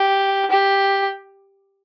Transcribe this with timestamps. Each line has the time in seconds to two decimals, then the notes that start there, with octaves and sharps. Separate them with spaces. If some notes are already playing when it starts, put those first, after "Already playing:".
Already playing: G4
0.50 G4